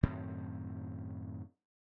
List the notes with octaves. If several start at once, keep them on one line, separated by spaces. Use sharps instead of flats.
F#2 A2 D#3 C4